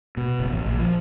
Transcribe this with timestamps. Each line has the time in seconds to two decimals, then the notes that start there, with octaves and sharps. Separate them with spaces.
0.17 B2
0.39 F#1
0.52 A1
0.66 A#1
0.79 F3